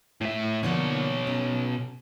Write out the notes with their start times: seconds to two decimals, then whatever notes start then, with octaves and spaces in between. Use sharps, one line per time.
0.21 A2 E5
0.63 B2 D3 F3 A#3 C#5
1.27 C#4